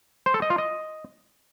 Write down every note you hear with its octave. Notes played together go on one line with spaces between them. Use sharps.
C5
A4
D#5
F4
D#5